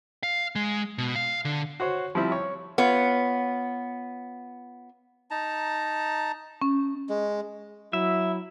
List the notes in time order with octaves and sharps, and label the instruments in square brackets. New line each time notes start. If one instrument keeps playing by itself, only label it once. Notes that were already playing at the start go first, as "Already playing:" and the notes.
[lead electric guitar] F5
G#3
B2
F5
D3
[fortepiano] F#4 C5 C#5
F3 G3 C4 E4
C#5
[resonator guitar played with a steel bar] B3 F4 C#5
[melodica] D#4 A5 A#5
[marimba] C#4
[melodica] G#3
[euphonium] F#3 [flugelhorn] E4 [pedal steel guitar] E5